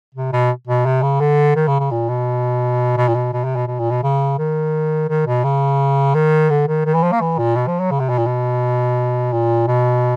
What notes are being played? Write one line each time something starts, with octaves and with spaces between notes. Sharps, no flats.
C3
B2
B2
C3
C#3
D3
D#3
C#3
C#3
A#2
B2
B2
A#2
B2
B2
C3
B2
B2
A#2
B2
C#3
D#3
D#3
B2
C#3
D#3
D3
D#3
D#3
E3
F3
A#3
E3
A#2
B2
F3
F#3
C#3
C3
B2
A#2
B2
A#2
B2